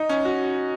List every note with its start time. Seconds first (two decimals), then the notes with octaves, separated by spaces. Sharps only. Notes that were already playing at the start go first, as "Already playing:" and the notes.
Already playing: D#4
0.09 C#4
0.25 F#4